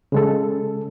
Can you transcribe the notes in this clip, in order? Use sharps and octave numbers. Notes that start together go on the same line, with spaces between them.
C#3 G#3 A4